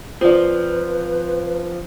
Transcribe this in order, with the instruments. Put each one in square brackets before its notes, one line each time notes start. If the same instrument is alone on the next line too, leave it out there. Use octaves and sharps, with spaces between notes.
[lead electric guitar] F3 C4 [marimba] F4 [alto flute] B4 [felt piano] C5 D5